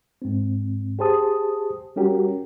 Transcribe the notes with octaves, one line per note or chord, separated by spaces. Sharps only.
G#2 C4
G4 G#4 C5 A5 D#6
G3 C#4 F#4 G4 A#4